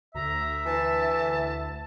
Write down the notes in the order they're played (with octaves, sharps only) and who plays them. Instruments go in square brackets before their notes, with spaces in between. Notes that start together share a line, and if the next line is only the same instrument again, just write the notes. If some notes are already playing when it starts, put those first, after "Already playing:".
[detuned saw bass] D2 [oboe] E5 [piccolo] A#5
[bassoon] E3 [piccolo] A5